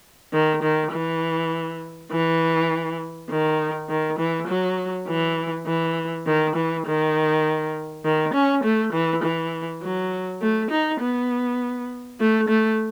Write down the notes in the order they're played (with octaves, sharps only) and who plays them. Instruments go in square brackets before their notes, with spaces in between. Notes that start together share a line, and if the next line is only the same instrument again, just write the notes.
[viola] D#3
D#3
E3
E3
D#3
D#3
E3
F#3
E3
E3
D#3
E3
D#3
D#3
C#4
A3
E3
E3
F#3
A3
D#4
B3
A3
A3